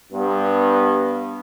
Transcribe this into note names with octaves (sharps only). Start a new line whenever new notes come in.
G2 B3